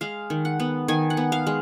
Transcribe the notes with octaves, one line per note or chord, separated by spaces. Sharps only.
G#3 F5
D#3
F#5
B3
D#3 G#5
F#5
B3
F5
G#3